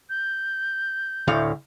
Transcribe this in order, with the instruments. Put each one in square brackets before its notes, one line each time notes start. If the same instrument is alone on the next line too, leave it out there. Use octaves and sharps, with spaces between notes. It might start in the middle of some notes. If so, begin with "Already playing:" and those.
[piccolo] G6
[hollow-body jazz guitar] D2 A2 F5